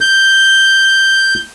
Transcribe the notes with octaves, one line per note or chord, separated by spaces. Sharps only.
G6